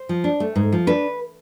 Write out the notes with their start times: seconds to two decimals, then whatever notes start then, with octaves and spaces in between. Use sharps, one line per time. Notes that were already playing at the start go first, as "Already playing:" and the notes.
Already playing: C5
0.09 F3
0.24 D4
0.40 A3
0.56 G#2
0.73 F3
0.87 D4 B4